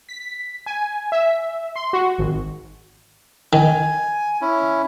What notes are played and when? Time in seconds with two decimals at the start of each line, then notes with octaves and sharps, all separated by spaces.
0.09 B6
0.66 G#5
1.12 E5
1.76 C6
1.93 F#4
2.18 G#1
3.53 D#3 G#5
4.41 C#4 E4